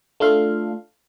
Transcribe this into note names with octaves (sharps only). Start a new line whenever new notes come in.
A3 D4 F4 A4 F5